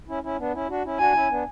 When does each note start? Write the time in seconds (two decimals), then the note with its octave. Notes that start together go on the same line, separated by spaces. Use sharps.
0.08 C#4 E4
0.23 C#4 E4
0.38 B3 D4
0.53 C#4 E4
0.69 D4 F#4
0.85 C#4 E4
0.99 D4 F#4 G#5
1.15 C#4 E4
1.30 B3 D4